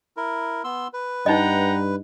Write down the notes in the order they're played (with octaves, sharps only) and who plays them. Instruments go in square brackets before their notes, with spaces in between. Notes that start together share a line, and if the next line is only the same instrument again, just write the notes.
[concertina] E4 A#4
B3 C6 E6
B4
[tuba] G2 [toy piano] D#4 D#5 [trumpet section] F#5 G5 A#5